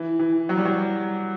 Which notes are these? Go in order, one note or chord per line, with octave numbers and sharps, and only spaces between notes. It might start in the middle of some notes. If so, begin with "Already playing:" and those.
Already playing: E3
E3
F#3
G3
F#3